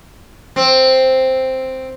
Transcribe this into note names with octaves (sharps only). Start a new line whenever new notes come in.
C4